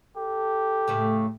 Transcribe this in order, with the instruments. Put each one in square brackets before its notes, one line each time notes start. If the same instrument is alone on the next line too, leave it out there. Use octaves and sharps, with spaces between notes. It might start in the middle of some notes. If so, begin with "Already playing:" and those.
[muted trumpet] G4 [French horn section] A4
[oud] A2 C#3 A3